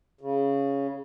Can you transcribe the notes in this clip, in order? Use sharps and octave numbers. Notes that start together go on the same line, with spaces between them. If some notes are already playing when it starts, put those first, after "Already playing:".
C#3